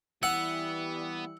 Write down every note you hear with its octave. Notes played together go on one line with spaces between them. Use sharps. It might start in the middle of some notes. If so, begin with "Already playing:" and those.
E3 G3 B3 F#5 E6